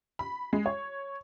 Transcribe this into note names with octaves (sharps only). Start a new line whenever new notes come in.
B5
G#3
C#5